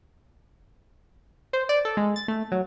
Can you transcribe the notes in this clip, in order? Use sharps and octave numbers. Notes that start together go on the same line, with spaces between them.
C5
D5
A4
G#3
A6
A3
F#3